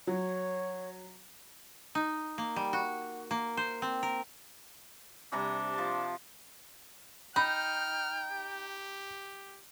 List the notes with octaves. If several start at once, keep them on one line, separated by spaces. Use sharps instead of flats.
F#3 C#5
D#4
A#3
G3
F#4
A#3
C5
C4
A#4
C3 G3 D4 A#5
F3 A5
D#4 G5 B5 F6
G4